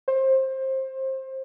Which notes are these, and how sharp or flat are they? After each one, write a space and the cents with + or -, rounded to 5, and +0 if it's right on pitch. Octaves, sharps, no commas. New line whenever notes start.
C5 +20